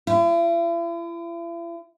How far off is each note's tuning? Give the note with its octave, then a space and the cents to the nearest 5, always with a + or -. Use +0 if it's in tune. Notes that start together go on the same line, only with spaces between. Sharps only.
E4 +45